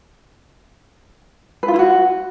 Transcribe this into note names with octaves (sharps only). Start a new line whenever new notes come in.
B4
F4
E4
F#4